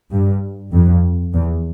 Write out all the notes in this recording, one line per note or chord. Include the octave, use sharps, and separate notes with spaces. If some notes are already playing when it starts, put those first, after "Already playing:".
G2
F2
E2